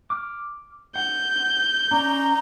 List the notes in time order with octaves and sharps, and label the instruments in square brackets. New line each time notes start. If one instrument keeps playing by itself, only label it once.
[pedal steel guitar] D6 F6
[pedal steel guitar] F#5 [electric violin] G6
[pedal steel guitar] C#4 D5 [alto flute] A#5